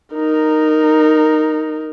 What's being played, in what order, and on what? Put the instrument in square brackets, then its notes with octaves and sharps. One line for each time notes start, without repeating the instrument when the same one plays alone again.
[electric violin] D#4 A#4